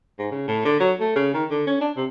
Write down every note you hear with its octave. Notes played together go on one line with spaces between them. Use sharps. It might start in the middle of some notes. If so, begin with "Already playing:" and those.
G#2
C#3
A2
D3
F#3
A3
C#3
D#3
D3
C#4
D4
C3